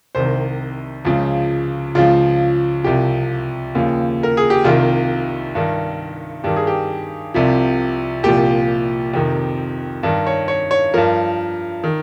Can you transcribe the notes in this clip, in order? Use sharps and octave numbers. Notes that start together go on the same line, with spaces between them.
C2 C3 D#3 C5
C#2 C#3 F3
C#2 C#3 F3 F4
C2 C3 F3 G4
D#2 C#3 F3
A#4
G#4
G4
C2 C3 D#3 F4
G2 D#3
G2 D#3 G4
G#4
G4
C2 C3 F3
C2 A#2 F3 G4
F2 C3 D#3
G2 D#3
C#5
C#5
C#5
G2 F3 A#4
D#3